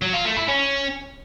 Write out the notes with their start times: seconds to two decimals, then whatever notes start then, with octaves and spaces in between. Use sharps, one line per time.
0.02 F#3
0.14 F4
0.25 A3
0.37 E4
0.48 C#4